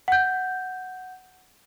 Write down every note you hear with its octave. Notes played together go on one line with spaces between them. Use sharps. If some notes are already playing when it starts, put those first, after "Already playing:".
F#5 G6